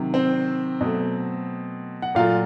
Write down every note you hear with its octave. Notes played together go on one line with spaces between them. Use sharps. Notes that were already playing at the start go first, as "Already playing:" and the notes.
Already playing: C3 D#3 F#3
C4 C5
B2 F#3 A3
F#5
A#2 F#3 A3 F4 F5